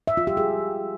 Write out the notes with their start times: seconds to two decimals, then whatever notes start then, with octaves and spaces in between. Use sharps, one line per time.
0.07 E5
0.17 F4
0.27 G4
0.37 G#4